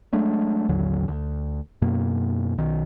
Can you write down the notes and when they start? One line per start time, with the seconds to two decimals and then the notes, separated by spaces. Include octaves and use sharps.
0.13 F#3 G#3 A3 D4
0.69 A1 D#2 D3 F#3
1.08 D2
1.82 F#2 B2 A#3
2.58 B1 D#3